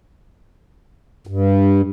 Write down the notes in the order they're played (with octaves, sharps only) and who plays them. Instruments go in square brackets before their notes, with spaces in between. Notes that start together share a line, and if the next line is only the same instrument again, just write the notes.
[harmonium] G2